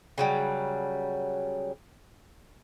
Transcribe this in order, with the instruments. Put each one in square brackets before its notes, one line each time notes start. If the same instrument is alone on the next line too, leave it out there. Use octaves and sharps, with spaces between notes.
[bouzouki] C#3 F#3 G3